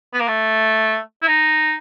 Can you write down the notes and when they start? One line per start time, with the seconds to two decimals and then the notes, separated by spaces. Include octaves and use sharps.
0.14 B3
0.20 A#3
0.28 A3
1.22 E4
1.28 D#4